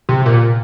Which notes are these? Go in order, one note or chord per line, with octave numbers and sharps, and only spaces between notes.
C3
A#2